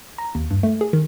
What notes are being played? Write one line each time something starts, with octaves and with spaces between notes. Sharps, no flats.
A#5
D#2
G2
A3
G#4
D#3